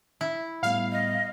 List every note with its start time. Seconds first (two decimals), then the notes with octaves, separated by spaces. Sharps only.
0.21 E4
0.63 A2 G3 B3 F5
0.92 D#5